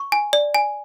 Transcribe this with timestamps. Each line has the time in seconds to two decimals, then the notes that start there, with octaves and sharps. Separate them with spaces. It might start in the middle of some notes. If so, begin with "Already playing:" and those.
Already playing: C#6
0.12 G#5
0.33 D5
0.54 G#5